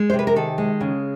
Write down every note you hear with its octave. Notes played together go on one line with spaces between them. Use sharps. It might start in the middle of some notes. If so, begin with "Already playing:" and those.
Already playing: G#3
C5
C3
B4
A#4
D#3 A4
G#3
C#3